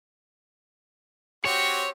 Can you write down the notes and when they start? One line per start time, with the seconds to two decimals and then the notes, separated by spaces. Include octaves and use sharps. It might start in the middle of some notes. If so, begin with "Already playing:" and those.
1.45 C4 F#4 G4 C#5